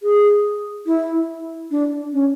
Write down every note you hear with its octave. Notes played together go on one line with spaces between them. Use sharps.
G#4
E4
D4
C#4